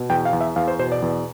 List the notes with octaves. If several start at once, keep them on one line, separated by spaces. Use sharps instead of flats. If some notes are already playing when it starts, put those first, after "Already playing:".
Already playing: B2
E2 G5
F5
E2
E5
E2 F5
C5
B2 C5
D5
E2